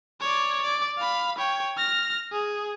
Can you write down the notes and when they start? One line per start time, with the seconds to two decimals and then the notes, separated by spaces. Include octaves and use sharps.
0.21 C#5 D5
0.62 D5
0.98 F5 B5
1.38 C#5 G5
1.77 F6 A#6
2.32 G#4